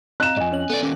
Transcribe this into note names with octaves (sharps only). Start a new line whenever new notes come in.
C4 D#5 F5 A#5 F#6 E7
F2 G#2 D#5 G#5
C#4 C#5 F#7
B3 A4 D5
D#2 C#4 G5 D6 A#6